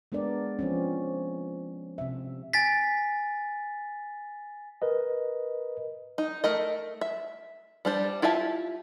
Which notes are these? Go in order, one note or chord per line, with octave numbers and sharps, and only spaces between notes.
G#3 B3 D4 A#4 D5
F3 C4 C#4
C3 E5
G#5 A6 B6
A#4 B4 D#5
D#4
A3 A#4 D#5
E5
G3 D4 C5
E4 F4 G4 E5 A5